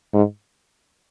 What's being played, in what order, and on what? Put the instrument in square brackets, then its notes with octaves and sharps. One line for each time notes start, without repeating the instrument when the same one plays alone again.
[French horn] G#2